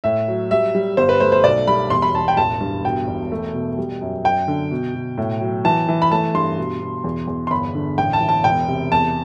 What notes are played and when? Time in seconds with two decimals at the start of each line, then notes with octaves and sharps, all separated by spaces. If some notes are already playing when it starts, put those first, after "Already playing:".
0.04 A2 E5
0.28 F#3
0.51 G3 E5
0.75 G3
0.97 G1 C5
1.09 B4
1.20 A3 C5
1.32 C5
1.44 B1 D5
1.67 G3 B5
1.90 E1 C6
2.02 B5
2.15 E1 A5
2.28 G5
2.37 A1 A5
2.61 G2
2.85 B2 G5
3.08 E1
3.32 A3
3.54 B2
3.78 G3
4.01 F#2
4.24 F#2 G5
4.48 D3
4.71 B2
4.95 B2
5.18 A2
5.41 F#3
5.65 E3 A5
5.88 E3
6.02 B5
6.11 A3 A5
6.34 G2 C6
6.58 B2
6.81 B2
7.04 E2
7.27 E2
7.47 C6
7.51 G1 B5
7.75 D3
7.98 A1 G5
8.13 A5
8.21 E3
8.29 A5
8.44 E1 G5
8.68 C3
8.92 E2 A5